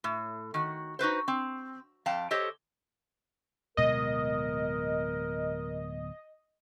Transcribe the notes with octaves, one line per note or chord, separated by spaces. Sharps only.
A2
D#3 F#4
D#4 F#4 B4 C5
C4
F2 F5 G5 A5
G4 A4 C5 C#5 D#5
D1 B2 G#3 A#4 D#5